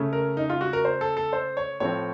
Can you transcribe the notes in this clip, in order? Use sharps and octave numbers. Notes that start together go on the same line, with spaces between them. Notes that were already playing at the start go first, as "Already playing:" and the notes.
Already playing: C#3 A3 C#4
A#4
D#4
F4
F#4
A#4
C5
A4
A4
C5
C#5
A2 F3 C4 C#5